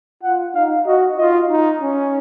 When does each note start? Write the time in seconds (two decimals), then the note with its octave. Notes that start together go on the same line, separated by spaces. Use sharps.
0.23 F4 F#5
0.55 D#4 F5
0.86 F#4 D#5
1.18 F4 D#5
1.49 D#4
1.81 C#4